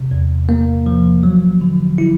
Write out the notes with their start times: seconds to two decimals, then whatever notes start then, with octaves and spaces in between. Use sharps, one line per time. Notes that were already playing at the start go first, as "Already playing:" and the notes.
Already playing: C3
0.11 E2
0.49 A#3
0.86 F3
1.23 F#3
1.61 D3
1.98 E4